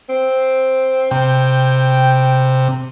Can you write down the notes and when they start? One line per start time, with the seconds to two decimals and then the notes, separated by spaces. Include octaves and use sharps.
0.09 C4
1.11 C3 G5